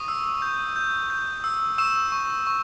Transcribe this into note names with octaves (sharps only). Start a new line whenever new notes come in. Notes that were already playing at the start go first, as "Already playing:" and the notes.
Already playing: C#6 D#6 D#7
E6
G6
G6
G6
E6
C#6 E6 E7
C#6
C#6